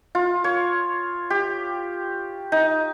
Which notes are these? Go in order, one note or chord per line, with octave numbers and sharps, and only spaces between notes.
F4
C#5
G4
D#4